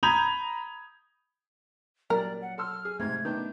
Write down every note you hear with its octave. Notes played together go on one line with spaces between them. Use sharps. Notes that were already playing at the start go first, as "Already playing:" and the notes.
A#5 B5 D#6 G6 G#6 F7
A#2 F#3 G3 A#4 D5
F#5
A4 C6 E6 F6
G#4
G#2 C3 A3 G#6
D#3 B3 D4 G6